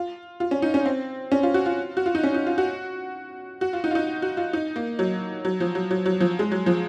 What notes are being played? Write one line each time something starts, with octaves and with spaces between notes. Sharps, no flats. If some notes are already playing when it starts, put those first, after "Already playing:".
Already playing: F4
F4
C#4
D#4
C#4
C4
C#4
F4
F#4
F4
F#4
F4
D#4
C#4
D#4
F4
F#4
F#4
F4
D#4
F4
D#4
F#4
F4
D#4
A#3
F#3
F#3
F3
F#3
F#3
F#3
F3
G#3
F#3
F3